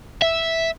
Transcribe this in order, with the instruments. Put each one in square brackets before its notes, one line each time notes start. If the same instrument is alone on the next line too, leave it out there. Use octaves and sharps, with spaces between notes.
[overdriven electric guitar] E5